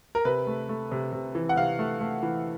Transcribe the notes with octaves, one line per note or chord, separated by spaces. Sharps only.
A#4
C3 B4
A3
A3
C3
C3
E3
F#5
C3 F5
A3
A3
E3